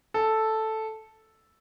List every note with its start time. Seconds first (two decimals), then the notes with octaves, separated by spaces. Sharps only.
0.14 A4